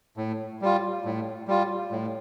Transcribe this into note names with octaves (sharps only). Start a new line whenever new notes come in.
A2
G3 F4
A2
G3 F4
A2